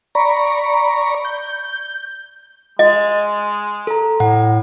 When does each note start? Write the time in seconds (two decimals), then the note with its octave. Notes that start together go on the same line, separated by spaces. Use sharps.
0.15 D5 A#5 B5 C#6
1.25 G6
2.79 G#3 D#5
3.87 A4 A#5
4.20 A2 F#5